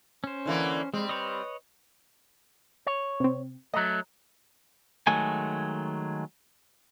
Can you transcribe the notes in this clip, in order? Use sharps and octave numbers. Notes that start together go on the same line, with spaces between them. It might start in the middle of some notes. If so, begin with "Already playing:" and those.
C#4 C5
D3 E3 A#3
G3 G#3 C4
B4 C#5 D#5
C#5
C3 C4
F#3 A3 D#5 A#5
D#3 F#3 G#3 A3 G#5